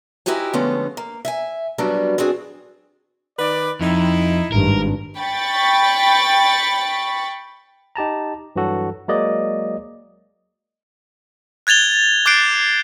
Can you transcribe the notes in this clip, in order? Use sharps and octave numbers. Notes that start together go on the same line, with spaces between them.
D#4 E4 F#4 G4 C5 G#5
D3 F3 G#3 A3 B3 C#4
A#3
E5 F5 G#5
F#3 G3 A#3 B3 D4 F#4
G#3 C4 D4 F#4 G#4
D#3 B4 D5
F2 D#4 E4
G#1 G2 A#4
G5 B5 C#6 A6
D#4 G4 A5 A#5
G2 E3 F#3 F#4 A4
F#3 G#3 A#3 D5 D#5
F#6 G#6 A6 F7 G7
D6 F#6 G6 C7 D7